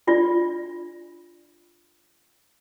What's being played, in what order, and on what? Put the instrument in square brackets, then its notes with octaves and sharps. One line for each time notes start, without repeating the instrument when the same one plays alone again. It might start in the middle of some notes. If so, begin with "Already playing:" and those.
[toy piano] D4 F4 D5